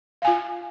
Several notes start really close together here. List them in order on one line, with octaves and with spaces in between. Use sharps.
F5 G#5 F4